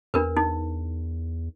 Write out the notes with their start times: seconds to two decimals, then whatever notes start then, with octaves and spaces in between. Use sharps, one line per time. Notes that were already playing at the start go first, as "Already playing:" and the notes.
0.14 E2 D4 A#4 B4
0.37 D#4